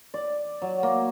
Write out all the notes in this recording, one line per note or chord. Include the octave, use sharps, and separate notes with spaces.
D5
F#3
A#3